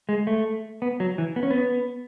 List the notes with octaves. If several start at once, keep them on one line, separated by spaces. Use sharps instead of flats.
G#3
A3
B3
F#3
E3
B3
C#4
B3